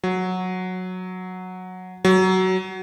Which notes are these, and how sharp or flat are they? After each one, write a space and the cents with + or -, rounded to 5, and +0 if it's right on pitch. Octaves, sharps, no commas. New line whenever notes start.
F#3 -10
F#3 +15